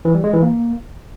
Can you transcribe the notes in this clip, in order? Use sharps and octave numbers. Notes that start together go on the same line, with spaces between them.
E3
G3
G#3
E3
A#3